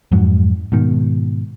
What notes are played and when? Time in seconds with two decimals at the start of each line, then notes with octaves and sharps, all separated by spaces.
0.12 F2 G#2 F#3
0.72 G#2 B2 D#3